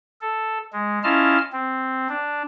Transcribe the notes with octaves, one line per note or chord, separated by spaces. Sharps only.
A4
G#3
C#4 E4 F4 D#5 A5 F6
C4
D4